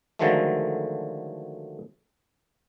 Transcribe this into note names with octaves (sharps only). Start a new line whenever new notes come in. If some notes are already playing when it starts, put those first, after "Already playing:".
D3 D#3 F3 F#3 G#3 A3